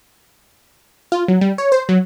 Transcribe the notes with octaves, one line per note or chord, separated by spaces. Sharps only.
F4
F#3
G3
C#5
C5
F#3